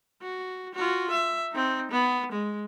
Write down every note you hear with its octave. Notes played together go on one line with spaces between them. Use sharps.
F#4
F4 F#4
E5
C4 D#4
B3
G#3